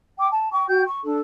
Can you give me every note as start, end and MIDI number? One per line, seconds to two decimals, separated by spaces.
0.18 0.27 79
0.18 0.27 86
0.31 0.52 81
0.53 0.67 79
0.53 0.67 85
0.68 0.83 66
0.68 0.83 79
0.68 0.83 91
0.87 0.99 85
1.02 1.19 62
1.02 1.19 69